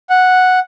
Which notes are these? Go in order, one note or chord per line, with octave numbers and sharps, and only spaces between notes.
F#5